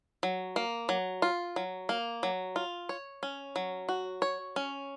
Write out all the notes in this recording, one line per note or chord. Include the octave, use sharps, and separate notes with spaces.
F#3
A#3
F#3
F4
F#3
A#3
F#3
F4
C#5
C#4
F#3
F#4
C#5
C#4